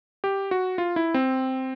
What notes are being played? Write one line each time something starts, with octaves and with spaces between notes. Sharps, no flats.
G4
F#4
F4
E4
C4